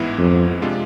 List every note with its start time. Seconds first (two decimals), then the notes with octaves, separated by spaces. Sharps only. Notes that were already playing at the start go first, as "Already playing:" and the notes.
Already playing: A1 G#2 E3 B3 E4
0.19 F2
0.62 C3 G#3 D4 F4